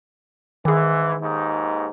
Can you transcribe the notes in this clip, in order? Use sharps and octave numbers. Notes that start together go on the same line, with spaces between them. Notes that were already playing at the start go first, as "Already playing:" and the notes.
G#2 D#3 E3 G#4
D#2 G#2 D#4